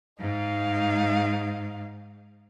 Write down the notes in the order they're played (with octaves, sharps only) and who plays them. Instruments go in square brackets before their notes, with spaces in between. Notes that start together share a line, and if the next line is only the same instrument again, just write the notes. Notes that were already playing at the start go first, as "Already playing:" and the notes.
[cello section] G#2 [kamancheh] D#4 F5